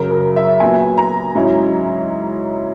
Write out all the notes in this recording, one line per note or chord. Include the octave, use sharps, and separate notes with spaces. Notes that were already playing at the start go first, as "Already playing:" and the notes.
Already playing: F#2 C#3 F#3 A#4
A#4
E5
A#2 F#3 B3 G#5
A#5
G#2 F#3 C#4 E4